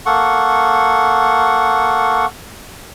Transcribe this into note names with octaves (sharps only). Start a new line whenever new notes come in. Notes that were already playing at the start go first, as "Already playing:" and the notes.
A#3 A4 F#5 C#6